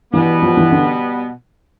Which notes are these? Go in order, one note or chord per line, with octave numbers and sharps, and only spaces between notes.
B2 E3 G3 B3
F3
E3
D3